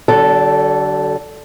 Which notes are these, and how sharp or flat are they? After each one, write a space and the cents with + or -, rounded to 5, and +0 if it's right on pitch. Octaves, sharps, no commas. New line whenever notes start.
D3 +0 F#3 +45 A4 -5